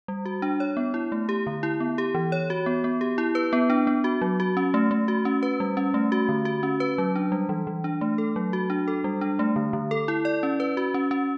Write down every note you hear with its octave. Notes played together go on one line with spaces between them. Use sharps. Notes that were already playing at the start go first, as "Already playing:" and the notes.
G3
F#4
D4
C#5
B3
E4
A3
G4
D3
E4
B3
G4
E3
C#5
F#4
B3
B3
G4
E4
B4
B3
D4
B3
F#4
F#3
F#4
C#4
A3
A3
F#4
C#4
B4
G3
C#4
A3
F#4
D3
F#4
C#4
B4
F#3
D4
G3
E3
E3
D4
A3
A4
F#3
F#4
D4
A4
G3
D4
A3
D3
D3
A4
E4
D5
C#4
B4
F#4
C#4
C#4